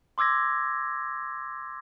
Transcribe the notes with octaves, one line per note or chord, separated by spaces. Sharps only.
C6 D6 E6 G#6 A#6